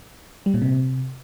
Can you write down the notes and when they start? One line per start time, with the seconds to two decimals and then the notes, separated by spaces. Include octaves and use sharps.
0.46 G3
0.54 A#2
0.62 C3